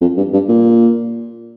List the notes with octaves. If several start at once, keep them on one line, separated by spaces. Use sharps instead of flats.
F2
G2
G2
A#2